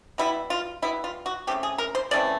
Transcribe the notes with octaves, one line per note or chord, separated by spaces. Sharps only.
B2 G3 B3 E4
F4
B2 G3 B3 E4
F4
F#4
C#3 E3 A3 C4 G4
G#4
A#4
C5
C#3 E3 A3 C4 D5